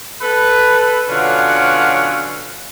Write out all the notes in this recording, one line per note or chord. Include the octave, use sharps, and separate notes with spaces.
A4 B4
B2 D3 F#3 C#4 F4 F#5